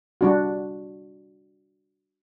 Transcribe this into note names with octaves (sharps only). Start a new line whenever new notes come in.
G3 D4 F#4